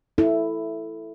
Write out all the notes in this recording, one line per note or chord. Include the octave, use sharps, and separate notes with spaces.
E4 A4